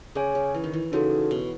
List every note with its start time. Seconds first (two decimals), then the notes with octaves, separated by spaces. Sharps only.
0.15 C#3 G#4 C#5 G#5
0.35 C#3
0.55 E3
0.64 D#3
0.73 E3
0.92 C#3 D#4 F#4 A4
1.31 B2